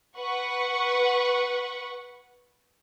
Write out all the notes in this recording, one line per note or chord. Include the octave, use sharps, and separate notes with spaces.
B4 F#5 C#6